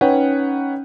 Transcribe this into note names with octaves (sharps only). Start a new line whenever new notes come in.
C#4 D#4 B4 C#5 F#5 G5